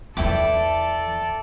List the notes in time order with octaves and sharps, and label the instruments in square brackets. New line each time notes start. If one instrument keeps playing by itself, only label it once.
[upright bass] E2 E3 [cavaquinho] E4 G5 D6 [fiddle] A4 D5